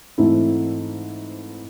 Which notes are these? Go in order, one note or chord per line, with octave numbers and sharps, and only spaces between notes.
G#2 E3 A3 C4 E4